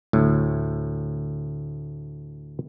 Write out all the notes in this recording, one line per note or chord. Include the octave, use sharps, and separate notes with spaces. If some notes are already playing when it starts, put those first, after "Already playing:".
D2 A2